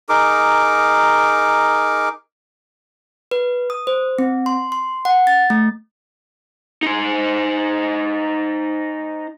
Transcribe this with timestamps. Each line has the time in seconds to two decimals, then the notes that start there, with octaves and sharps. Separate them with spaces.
0.09 D#4 G#4 A#4 D6
3.31 B4
3.70 D#6
3.87 C5
4.19 C4
4.46 C6
4.72 C6
5.05 F#5
5.27 A6
5.50 A3
6.83 D#4 C5